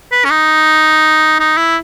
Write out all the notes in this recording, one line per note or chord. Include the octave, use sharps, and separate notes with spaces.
B4
C#4
D#4
D#4
E4